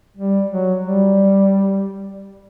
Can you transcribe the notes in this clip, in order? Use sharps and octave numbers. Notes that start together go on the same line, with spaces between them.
G3
F#3
G3